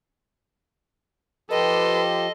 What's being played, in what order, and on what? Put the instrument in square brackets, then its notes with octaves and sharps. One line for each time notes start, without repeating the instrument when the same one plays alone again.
[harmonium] F3 G4 [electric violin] A4 C6 [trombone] B4 [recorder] D#5